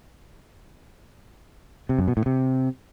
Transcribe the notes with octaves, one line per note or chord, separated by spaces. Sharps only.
C3
F#2
B2
A2
C3